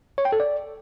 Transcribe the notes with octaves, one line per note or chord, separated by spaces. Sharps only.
C#5
G5
A4
D5